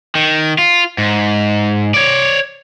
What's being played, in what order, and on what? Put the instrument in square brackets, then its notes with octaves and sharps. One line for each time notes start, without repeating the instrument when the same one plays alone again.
[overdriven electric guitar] D#3
F4
G#2
C#5 D5